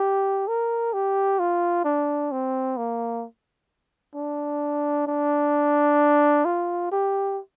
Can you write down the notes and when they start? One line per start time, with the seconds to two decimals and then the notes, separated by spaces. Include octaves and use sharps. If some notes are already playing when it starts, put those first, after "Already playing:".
Already playing: G4
0.48 A#4
0.93 G4
1.39 F4
1.85 D4
2.32 C4
2.77 A#3
4.15 D4
5.07 D4
6.45 F4
6.92 G4